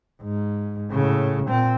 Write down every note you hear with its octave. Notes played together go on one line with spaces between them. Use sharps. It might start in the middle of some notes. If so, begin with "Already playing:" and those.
G#2
A2 C#3
A#2 C4